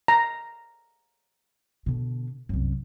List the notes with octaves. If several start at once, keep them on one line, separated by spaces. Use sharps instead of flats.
A#5
B2 D3
C2 F#2